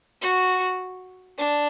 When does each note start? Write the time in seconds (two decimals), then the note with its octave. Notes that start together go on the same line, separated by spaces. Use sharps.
0.22 F#4
1.38 D4